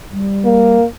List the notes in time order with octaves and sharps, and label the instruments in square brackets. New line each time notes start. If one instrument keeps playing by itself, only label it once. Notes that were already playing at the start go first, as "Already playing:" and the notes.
[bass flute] G3
[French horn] A#3